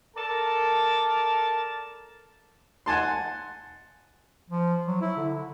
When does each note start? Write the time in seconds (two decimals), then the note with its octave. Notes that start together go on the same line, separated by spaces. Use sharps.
0.17 A4 A#4 D5 A5
2.86 F#5 G#5 A5 C6
4.50 F3
4.87 F#3
5.01 E4
5.17 D3